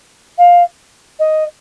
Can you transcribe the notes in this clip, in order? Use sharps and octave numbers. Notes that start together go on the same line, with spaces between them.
F5
D#5